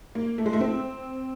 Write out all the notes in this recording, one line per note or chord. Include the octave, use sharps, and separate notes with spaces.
A#3
A3
G#3
A3
C4